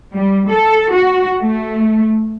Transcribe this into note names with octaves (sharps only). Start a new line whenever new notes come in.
G3
A4
F#4
A3